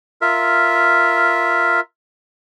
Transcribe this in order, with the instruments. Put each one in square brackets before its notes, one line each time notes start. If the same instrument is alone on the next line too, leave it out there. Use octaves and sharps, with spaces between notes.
[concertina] F4 A#4 E5